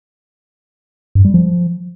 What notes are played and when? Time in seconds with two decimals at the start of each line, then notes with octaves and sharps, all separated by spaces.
1.15 G2
1.25 G3
1.34 F3